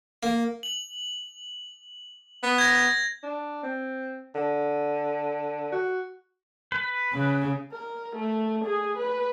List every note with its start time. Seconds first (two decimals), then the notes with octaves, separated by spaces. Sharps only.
0.23 A#3
0.63 F#7
2.43 B3
2.58 G#6 A#6
3.23 D4
3.63 C4
4.35 D3
5.72 F#4
6.72 B4
7.13 C#3
7.72 A#4
8.16 A3
8.65 G#4
8.98 B4